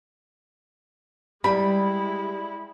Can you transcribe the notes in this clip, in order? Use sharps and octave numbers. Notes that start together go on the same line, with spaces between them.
G3 G#3 E4 B5